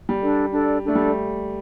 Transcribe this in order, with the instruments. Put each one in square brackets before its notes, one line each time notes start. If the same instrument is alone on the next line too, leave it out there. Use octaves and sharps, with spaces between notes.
[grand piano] G3
[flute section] D4 A4 D5
D4 A4 D5
[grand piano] A3 [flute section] D4 A4 D5
[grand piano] G3